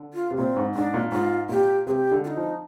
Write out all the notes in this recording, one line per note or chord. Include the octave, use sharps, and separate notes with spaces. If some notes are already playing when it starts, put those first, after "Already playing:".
Already playing: D3
F4
C3
A#2 C4
G#2
G#2 D4
A#2
G#2 F4
A#2 G4
C3 G4 G#4
D3
F4
D#4
F3